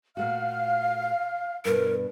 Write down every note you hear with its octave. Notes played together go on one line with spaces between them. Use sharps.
A#2 A3 F#4 F5 F6
G2 B2 A#4